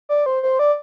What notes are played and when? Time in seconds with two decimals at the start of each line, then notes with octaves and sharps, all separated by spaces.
0.09 D5
0.26 C5
0.43 C5
0.59 D5